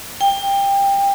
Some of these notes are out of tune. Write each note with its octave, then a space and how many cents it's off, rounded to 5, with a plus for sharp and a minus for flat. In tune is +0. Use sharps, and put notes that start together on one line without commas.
G5 +20